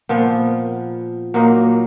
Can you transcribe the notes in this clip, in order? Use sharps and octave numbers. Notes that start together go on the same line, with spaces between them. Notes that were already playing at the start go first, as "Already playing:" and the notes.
A#2 F3 B3
A#2 F#3 A#3 D#4